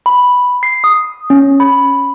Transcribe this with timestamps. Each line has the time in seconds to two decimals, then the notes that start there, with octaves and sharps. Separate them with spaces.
0.06 B5
0.63 C7
0.84 D#6
1.30 C#4
1.60 B5